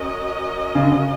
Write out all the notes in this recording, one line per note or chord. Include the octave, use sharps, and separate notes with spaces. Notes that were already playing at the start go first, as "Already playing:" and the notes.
Already playing: C#4 F#4 A#4 D#5
C#3
D3
C#3